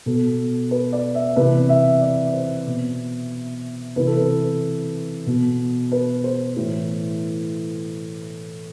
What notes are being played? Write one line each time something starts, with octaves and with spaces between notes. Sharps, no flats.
B2 A4
B4
D5
E5
C3 E3 B4
E5
D5
C5
B2
C3 E3 B4
A4
B4
B2
B4
C5
A2 E3